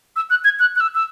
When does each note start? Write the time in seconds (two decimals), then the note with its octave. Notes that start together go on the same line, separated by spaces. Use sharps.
0.16 E6
0.30 F#6
0.44 G#6
0.59 F#6
0.76 F#6
0.80 E6
0.95 E6